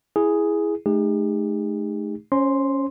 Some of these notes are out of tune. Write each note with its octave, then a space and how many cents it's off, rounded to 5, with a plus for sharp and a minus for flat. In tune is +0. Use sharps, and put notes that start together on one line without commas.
E4 +0 G#4 +0
A3 -30 D#4 -10 G4 +45
C#4 +0 C5 +30 C6 +0